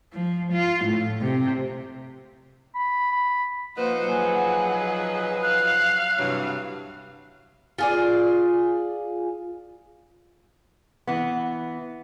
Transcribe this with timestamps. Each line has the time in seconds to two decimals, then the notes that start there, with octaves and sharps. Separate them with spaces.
0.13 F3
0.53 F4
0.85 A2
1.21 C3
2.75 B5
3.12 B5
3.77 F3 A#3 D#4 B4 C5 F#5
4.07 F#3 G#4
5.43 F5 F#6
6.17 G2 C3 E3 F#3
7.78 F4 G#4 D5
11.07 E3 B3